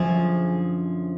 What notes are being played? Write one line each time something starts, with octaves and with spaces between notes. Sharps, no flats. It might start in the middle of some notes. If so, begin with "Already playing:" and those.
Already playing: F#2 D3 F3 G#4